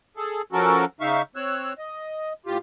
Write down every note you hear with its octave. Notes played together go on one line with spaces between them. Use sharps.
G#4 A4
F3 C#4 F#4 A4 A#4
C#3 D#4 E5 F5 C#6
C4 C#5 E6 F#6
D#5
A2 F4 G4